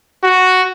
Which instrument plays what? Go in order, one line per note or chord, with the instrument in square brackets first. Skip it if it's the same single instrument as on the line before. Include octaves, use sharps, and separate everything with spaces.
[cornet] F#4